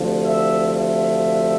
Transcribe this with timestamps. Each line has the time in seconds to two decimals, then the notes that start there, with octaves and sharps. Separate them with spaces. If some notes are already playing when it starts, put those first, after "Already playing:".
Already playing: D2 C3 F3
0.25 E5
0.72 E5